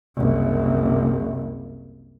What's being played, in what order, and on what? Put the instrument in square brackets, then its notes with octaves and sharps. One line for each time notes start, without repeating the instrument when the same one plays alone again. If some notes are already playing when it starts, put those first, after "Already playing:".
[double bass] F#1 C2